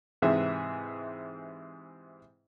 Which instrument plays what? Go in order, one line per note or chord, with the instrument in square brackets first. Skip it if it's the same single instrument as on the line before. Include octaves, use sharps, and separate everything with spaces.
[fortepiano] G#2 C3 E3 G#4 E5